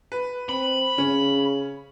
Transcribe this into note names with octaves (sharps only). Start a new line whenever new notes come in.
B4
C4 B5
C#3 C#4